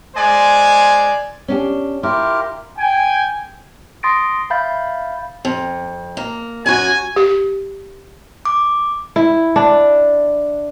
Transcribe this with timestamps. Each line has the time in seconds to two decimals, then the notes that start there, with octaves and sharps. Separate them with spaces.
0.16 G#3 C5 D5 G#5
1.48 C#4 D4 G4
2.03 E4 F4 G4 A#4
2.77 G5 G#5
4.03 C6 D#6 A6 A#6 D7
4.50 E5 F5 B5 G6 A6
5.45 F2
6.17 A#3
6.66 F#2 F#4 G#5
7.16 G4
8.45 D6
9.16 E4
9.56 D4